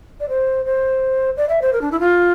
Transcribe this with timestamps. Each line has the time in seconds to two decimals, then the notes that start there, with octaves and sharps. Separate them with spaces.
0.20 D5
0.29 C5
0.66 C5
1.37 D5
1.49 E5
1.62 C5
1.73 A#4
1.82 D4
1.92 E4
2.00 F4